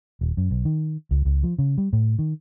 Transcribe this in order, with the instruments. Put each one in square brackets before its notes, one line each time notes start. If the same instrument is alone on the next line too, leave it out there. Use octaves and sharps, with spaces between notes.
[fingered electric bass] D#1
F#2
B1
D#3
C#2
C#2
F3
C#3
G3
A2
D#3